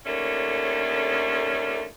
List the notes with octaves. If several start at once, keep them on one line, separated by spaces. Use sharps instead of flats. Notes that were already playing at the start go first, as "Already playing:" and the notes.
D#2 D3 A3 C#4